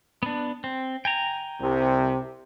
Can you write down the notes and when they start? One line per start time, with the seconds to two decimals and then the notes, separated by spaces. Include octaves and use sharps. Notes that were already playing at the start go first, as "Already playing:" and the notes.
0.23 B3 D4
0.64 C4
1.05 G5 G#5 A#5
1.61 C2 C3